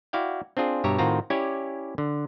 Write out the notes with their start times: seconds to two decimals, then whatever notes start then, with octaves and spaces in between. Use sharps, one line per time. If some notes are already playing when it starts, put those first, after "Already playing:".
0.13 E4 F#4 D5 F5 G5
0.57 C4 D4 F4 G#4
0.84 G2 B2 G4 C#5 E5 A#5
0.99 A2 D#3 C4 F4 F#4 A#5
1.30 C#4 E4 G4 C#5 D5 G#5
1.98 D3